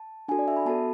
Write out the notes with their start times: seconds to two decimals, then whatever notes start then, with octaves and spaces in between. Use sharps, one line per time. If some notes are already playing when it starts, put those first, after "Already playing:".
Already playing: A5
0.28 D4 F#4 A4 G#5
0.39 D5
0.48 E5
0.56 B5
0.65 B3 F#4 A4 A5